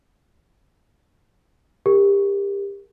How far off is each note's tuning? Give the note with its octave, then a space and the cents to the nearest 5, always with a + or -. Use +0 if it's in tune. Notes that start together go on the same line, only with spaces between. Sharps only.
G4 +25 A#4 +0